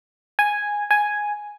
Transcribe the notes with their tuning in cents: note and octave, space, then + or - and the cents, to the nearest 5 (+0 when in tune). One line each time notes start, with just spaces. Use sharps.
G#5 -5
G#5 +0